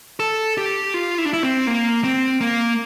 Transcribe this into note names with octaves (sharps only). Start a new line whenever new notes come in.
A4
G4
F4
E4
D4
E4
C4
A#3
C4
A#3